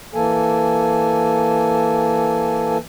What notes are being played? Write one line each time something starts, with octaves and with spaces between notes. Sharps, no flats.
E3 A#3 A4 G#5